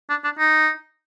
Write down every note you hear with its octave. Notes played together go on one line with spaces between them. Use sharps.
D4
D4
D#4